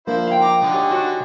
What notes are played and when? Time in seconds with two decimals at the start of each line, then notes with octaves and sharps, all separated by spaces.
0.07 F3 A#3 D4 E4 C5
0.27 F5 G5
0.41 A#5 D6
0.61 D3 D#4
0.74 G4 C#5 G#5
0.91 F#4